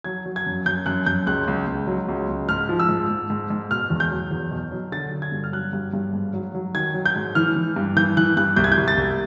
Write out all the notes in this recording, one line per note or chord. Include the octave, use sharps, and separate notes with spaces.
F#3 G#6
F#3
G#6
F#2
F#2 G6
F#2 F#6
F#2 G6
C#2 F#6
C#2
C#2
F#3
C#2
C#2
G#2 F6
F3
E6
G#2
G#2
G#2
G#2
B2 F6
E2
G6
F#3
E2
B2
F#3
D3 A6
D3
G#6
G2
F6
F#3 F#6
G2
G2
G#2
F#3
F#3
D#3 G#6
F#3
G6
G#2
E3 F6
E3
G2
E3 G6
E3 F#6
G2 F#6
C2 G6
G#6
G6
C2
A6
C2